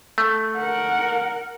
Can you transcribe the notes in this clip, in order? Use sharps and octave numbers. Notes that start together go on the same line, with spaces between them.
A3
A#4 F#5